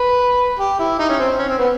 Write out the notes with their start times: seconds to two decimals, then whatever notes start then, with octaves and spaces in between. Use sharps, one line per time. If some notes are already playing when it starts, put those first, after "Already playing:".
Already playing: B4
0.59 G4
0.79 E4
0.99 D#4
1.09 C#4
1.19 C4
1.39 C#4
1.49 C4
1.59 B3